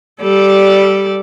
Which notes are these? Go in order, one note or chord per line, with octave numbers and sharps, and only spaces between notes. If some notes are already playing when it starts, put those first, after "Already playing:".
G3 A4 D5